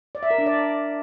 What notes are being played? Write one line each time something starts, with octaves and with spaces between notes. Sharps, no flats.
D5
E5
A#4
D4
D5